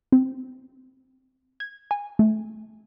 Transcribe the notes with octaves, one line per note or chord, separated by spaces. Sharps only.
C4
G#6
G#5
A3